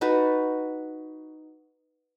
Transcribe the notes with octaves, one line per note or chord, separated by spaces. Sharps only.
D#4 F#4 B4 A5